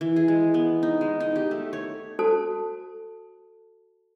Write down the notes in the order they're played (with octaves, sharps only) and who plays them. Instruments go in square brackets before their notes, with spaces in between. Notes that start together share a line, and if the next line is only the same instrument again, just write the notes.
[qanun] E3
G#4
G#3
B3
D#4
G#3
D#4
G4
A3
C#5
[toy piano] F#4 A4 C5 A5